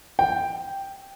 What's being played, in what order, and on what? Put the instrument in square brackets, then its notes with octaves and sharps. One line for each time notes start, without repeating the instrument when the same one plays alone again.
[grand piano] G5